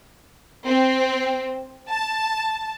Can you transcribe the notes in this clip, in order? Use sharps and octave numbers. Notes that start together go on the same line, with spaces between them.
C4
A5